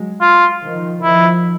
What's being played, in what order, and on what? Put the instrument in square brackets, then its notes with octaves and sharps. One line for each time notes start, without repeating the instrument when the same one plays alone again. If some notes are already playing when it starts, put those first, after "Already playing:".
Already playing: [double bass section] F#3 G#3
[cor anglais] F4
[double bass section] D#3 F3
[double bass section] D#3 F3 [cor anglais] E4